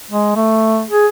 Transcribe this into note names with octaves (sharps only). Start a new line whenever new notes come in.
G#3
A3
G#4